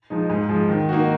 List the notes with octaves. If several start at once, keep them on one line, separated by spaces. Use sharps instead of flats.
F3 G#3 D#4
G#2
F3 G#3
D#3
A#3 D#4 F#4